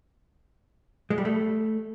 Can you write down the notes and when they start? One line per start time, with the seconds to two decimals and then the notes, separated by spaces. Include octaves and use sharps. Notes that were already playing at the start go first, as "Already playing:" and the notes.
1.10 G#3
1.18 G3
1.25 A3